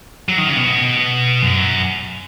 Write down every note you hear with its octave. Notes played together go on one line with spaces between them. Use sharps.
F#3
D#3
C#3
B2
F#2